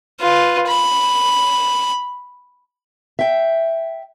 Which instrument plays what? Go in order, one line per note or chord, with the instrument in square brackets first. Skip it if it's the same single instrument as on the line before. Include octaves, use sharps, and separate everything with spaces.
[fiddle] F4 B4
B5
[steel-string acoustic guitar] E5 G5